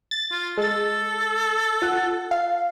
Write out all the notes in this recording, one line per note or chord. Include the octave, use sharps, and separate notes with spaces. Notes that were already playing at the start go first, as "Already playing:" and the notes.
A6
F4
G#3 A4 A6
F4 F#5
F5